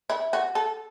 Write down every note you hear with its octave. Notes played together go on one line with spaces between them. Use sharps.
E4
F#4
A4